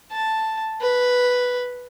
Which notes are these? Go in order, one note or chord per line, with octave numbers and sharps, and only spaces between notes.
A5
B4